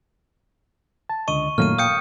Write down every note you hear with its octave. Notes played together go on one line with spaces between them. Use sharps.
A5
C#2 D3 D#5 C#6 D#7
F#2 A#2 D#3 F#3 A3 A#3 F6 D#7
F5 G5 D#6 G6 C#7